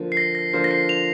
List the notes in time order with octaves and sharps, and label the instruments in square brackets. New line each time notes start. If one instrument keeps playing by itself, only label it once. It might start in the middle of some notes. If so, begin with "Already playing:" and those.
Already playing: [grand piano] D3 F3 A#3
[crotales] C7
A#6
A#6
[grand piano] D3 F3 A#3 F4 C5
[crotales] A#6
C7
F7